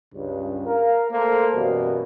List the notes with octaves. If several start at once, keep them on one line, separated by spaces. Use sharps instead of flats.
C#2 G2
A#4 F5
A3 A#3 A4 C5
F#2 B2 E3 G3 A#3